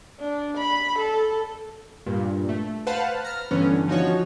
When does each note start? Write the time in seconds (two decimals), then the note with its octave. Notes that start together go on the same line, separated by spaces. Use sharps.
0.20 D4
0.57 B5
0.99 A4
2.06 G2 A#2
2.49 A3
2.87 B4 C5 F5 F#5 A5 B5
3.24 A#5 F6
3.51 G2 D3 E3 B3 C#4
3.88 F3 D#4 F#4 C#5